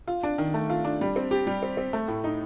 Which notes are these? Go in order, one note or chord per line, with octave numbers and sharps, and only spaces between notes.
F4
D4
D#3
A3
F4
D4
G3
C4
G4
G3
C4
C4
A3
A2
D#4